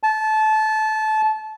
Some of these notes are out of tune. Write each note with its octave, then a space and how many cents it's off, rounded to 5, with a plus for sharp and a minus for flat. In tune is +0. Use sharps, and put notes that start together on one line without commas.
A5 -20